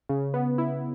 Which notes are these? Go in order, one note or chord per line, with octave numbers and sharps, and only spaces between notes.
C#3
B3
E4